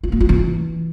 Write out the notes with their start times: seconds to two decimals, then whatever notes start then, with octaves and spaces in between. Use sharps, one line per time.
0.03 F4
0.12 A#3
0.20 F4
0.29 E3